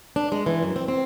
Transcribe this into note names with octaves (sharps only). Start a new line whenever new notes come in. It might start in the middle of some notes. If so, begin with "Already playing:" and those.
D4
G#3
E3
F#2
C4
C4